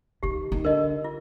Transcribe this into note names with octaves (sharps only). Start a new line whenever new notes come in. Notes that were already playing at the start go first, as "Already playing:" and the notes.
D#3 G4
D#3
D3 A#4 D#5
F4